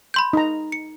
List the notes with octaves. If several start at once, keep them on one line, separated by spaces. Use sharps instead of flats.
B5 C6 G6
D#4 A#5
C#7